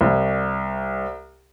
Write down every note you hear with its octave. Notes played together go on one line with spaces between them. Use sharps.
C2